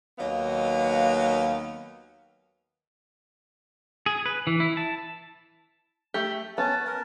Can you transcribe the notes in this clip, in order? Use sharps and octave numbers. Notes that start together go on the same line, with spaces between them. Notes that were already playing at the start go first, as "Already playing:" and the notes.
D#2 F#3 A#3 B3 D#5 F5
G#4
B4
E3
E4
A5
A3 G4
B3 C#4 A5
A#4